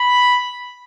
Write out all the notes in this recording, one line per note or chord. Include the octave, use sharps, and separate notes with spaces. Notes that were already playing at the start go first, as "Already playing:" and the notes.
Already playing: B5